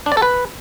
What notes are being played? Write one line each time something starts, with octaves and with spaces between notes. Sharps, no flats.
D4
D5
A4
B4